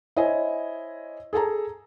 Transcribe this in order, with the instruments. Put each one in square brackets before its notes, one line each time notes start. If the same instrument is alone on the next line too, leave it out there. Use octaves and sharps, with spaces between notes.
[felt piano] E4 C5 C#5 D#5 G#5
G#4 A4 A5 A#5